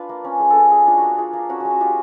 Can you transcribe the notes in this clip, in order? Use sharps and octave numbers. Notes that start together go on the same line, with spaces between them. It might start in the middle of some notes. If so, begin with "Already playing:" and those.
Already playing: D4 F4 B4
A#3
C#4
G#3
A4
F4 A#4
G#3 G#4
D4 F4
F#4
A#3
F4 G#4
A#3
C#4 F#4
G#3 F#4
F#4
F4 G4